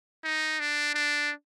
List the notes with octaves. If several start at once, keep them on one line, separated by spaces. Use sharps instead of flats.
D#4
D4
D4